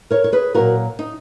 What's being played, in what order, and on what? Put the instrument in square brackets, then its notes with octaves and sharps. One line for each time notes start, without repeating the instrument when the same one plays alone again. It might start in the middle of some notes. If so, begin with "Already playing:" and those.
[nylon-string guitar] A#4 C#5
C#5
G#4 B4
A#2 F#3 A#3 F#4 A#4
D#4